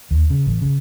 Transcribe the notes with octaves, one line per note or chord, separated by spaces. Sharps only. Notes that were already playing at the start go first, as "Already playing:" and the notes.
D#2
C#3
A1
C#3